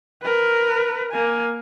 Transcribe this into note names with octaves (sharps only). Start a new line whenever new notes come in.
A#4 B4
A#3 G#5